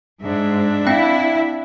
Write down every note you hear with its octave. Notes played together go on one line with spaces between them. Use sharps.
G#2 D4 E5
C4 E4 G5